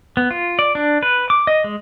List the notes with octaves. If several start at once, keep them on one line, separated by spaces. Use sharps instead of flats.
B3
F4
D5
D4
B4
D6
D#5
G#3